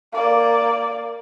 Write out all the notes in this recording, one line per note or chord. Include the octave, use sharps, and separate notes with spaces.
A#3 D5